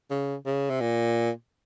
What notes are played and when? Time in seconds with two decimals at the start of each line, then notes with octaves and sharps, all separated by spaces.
0.11 C#3
0.46 C#3
0.70 C3
0.80 A#2